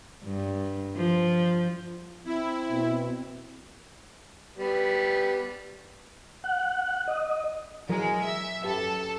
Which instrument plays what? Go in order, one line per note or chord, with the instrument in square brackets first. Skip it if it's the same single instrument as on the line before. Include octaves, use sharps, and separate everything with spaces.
[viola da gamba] G2
F3
[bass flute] C4 [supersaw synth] E4
[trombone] B2
[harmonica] G3 B3
[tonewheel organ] F#5
D#5
[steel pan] E3 F#3 A#4 [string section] G#3
[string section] E5
[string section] F#2 A4 A5 [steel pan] G4 B4